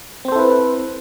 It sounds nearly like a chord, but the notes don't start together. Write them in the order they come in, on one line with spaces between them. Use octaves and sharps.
C4 C5 A4 E4 B4